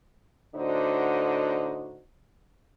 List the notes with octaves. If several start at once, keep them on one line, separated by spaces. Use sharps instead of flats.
A2 D3 D4 D#4 F#4 C5